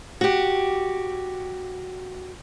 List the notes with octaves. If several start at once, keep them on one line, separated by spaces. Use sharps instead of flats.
F#4 G4